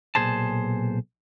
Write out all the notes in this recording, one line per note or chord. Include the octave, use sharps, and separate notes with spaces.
B1 A#2 G#4 C5 A5